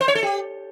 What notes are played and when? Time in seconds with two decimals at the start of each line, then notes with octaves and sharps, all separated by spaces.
0.01 C5
0.08 C#5
0.15 A4
0.23 G4